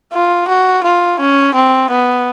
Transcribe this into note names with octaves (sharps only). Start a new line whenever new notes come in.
F4
F#4
F4
C#4
C4
B3